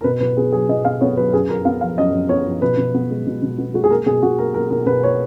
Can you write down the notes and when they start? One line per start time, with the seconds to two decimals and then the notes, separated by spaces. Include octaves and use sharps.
0.01 A#4
0.04 B2 B4
0.20 B2 B4
0.37 B3 G#4
0.52 F#3 G#4
0.69 B2 D#5
0.85 B2 F5
1.01 B3 C#5
1.17 F#3 B4
1.33 F#2 G#4
1.49 F#2 A#4
1.65 B3 F5
1.81 F3 F5
1.97 F#2 D#5
2.13 F#2
2.29 B3 C#5
2.46 F3
2.62 B2 B4
2.77 B2
2.94 B3
3.11 G#3
3.27 B2
3.43 B2
3.58 B3
3.74 G#3 F#4
3.84 G#4
3.90 A#3 A#4
4.06 B2 G#4
4.22 B2 F#4
4.38 A#3 A#4
4.54 A#3 A#4
4.70 B2 A#4
4.86 B2 B4
5.03 A#3 C#5